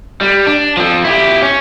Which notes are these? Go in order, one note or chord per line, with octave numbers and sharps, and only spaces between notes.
G3
D4
F3 C4
E4 G4
C#4